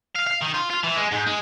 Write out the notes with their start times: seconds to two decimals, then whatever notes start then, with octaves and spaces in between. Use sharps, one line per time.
0.15 F5
0.26 F5
0.41 D#3
0.54 F4
0.70 F4
0.84 E3
0.97 G#3
1.12 G#2
1.26 G#3